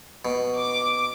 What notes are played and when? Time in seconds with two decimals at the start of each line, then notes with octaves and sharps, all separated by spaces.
0.25 B2
0.57 D6